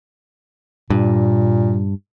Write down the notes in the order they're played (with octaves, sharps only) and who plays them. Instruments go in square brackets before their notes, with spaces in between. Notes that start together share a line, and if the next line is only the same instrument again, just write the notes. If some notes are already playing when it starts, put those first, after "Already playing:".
[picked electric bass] G2 [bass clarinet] A#2